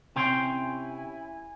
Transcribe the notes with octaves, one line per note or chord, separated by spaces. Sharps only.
C3 C#4 E4 C#5 G5 G#5 C6